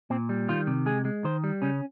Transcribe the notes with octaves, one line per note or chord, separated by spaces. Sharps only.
A#2 C4
G3
D#3 F4
C3
G#3 G#4
G#3
D#3 C5
G3
C#3 C#4